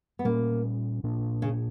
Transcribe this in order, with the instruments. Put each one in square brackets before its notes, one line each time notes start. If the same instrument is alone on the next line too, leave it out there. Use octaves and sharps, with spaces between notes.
[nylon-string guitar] B3
[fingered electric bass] A#2 G3 C#4 [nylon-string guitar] A#3
[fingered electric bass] A#2 A#3 D4
[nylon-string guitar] C#3